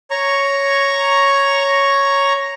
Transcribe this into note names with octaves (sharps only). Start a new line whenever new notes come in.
C#5 A#5 C#6